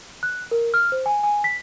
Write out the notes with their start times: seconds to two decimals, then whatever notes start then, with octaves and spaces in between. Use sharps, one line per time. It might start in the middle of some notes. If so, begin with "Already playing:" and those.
0.23 F#6
0.51 A#4
0.74 F6
0.92 C5
1.06 G#5
1.23 G#5
1.44 B6